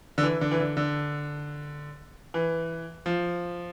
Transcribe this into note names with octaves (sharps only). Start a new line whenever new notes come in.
D3
E3
D3
E3
D3
D3
E3
F3